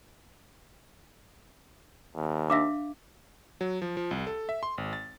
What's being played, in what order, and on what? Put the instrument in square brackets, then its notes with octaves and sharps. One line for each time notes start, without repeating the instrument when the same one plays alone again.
[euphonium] D#2
[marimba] D4 E6 A#6 [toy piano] E5 F5 D6
[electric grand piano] F#3
F3
F3
C2
A4
E5
C6
G#1
A6